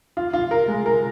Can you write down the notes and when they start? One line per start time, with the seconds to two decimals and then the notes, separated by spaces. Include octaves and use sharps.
0.17 F4
0.33 F4
0.51 A#4
0.68 G#3
0.86 A#4